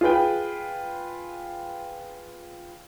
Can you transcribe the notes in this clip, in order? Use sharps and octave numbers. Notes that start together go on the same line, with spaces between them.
F4 G#4 B4 G5